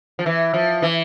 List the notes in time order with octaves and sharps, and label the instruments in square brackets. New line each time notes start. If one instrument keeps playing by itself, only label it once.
[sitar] F3
E3
F3
E3